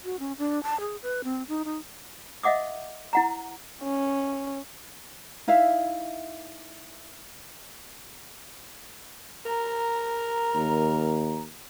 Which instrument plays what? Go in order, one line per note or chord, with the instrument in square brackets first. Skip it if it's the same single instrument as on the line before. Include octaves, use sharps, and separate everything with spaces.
[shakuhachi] F#4
C#4
D4
A5
G#4
B4
C4
D#4
D#4
[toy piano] D#5 E5 F#5 D6 D#6
E4 F#5 A#5
[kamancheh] C#4
[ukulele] D#4 E4 E5 F5
[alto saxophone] A#4 [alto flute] A#5
[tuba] D#2